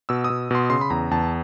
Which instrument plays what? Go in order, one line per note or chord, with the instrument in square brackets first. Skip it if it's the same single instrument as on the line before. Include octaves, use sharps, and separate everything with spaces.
[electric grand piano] B2 E6
D#6
B2
B2 C6
C#3 C6
B5
E2 A#5
E2 A5